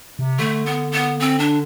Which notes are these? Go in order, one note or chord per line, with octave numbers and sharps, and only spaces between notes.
C3
D3 A3
B3
B3
C4
D4